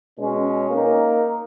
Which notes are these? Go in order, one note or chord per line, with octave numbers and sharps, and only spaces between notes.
B2 G#3 C#4
A#3 D#4 A#4